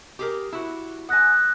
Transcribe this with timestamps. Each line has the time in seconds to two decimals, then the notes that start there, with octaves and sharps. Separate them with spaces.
0.19 G4 G#4 A#4
0.52 E4 F#4
1.09 F#5 G#5 D#6 F#6 A#6